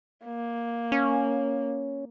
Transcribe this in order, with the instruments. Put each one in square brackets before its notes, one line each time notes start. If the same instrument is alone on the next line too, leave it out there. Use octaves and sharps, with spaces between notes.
[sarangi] A#3
[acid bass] C#4